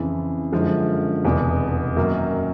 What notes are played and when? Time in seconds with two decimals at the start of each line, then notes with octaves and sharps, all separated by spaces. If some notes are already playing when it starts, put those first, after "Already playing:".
Already playing: F2 C#3 E3
0.52 F#2 D3 F3 G#3
1.24 F1 E2 B2
1.96 F#2 D#3 F#3 A#3